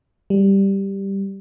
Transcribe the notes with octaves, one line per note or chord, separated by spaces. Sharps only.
G3